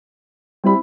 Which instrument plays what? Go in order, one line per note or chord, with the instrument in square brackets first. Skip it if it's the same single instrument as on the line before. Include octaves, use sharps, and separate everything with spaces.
[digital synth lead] G3 [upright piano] C4 E4 B5